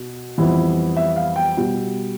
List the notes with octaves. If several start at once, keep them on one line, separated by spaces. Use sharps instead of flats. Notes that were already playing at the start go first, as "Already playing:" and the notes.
Already playing: B2
F2 E3 G3 B3 E4
E5
F5
G5
B2 G3